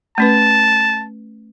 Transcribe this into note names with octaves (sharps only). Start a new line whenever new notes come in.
A3 C#4 B4 A5